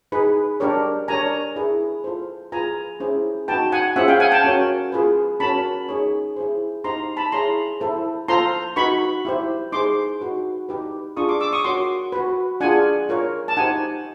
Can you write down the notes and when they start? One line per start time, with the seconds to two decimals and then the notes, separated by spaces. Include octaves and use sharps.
0.12 D#4 G#4 B4
0.60 D4 G4 A#4 C#5
1.08 D4 G4 A#4 C#5 G#5 A#5
1.56 E4 G#4 B4
2.04 F4 A4 C5
2.52 F4 G#4 B4 G#5 A#5
3.00 C#4 E4 G#4 C5
3.48 D#4 F#4 B4 G5 A5
3.72 F#5 G#5
3.96 C#4 F4 G#4 C5 E5 F#5
4.08 F5 G5
4.20 F#5 G#5
4.32 G5 A5
4.44 C#4 F#4 A#4 C#5
4.92 F4 G#4 B4
5.40 C#4 F#4 A#4 C#5 A5 B5
5.89 D#4 G#4 C#5
6.36 E4 G#4 C5
6.84 D#4 G4 C5 A#5 C6
7.17 A5 B5
7.32 E4 G#4 C#5 A#5 C6
7.80 E4 A4 C5
8.28 F4 A4 C5 A#5 C6
8.76 D#4 F#4 B4 B5 C#6
9.25 E4 G4 C5
9.72 D#4 G#4 C5 C6 D6
10.21 D#4 F#4 B4
10.69 D#4 G4 B4
11.17 D4 F4 G#4 C#6 D#6
11.29 C6 D6
11.40 D6 E6
11.53 C#6 D#6
11.65 F#4 A#4 C#5 C6 D6
12.12 F#4 B4
12.60 D4 F4 G#4 F#5 G#5
13.09 F4 A#4 C#5
13.48 A5
13.57 D#4 G4 C5 F#5 G#5